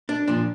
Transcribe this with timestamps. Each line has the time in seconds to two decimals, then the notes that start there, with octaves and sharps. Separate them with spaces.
0.09 D4
0.28 A#2 F3 D4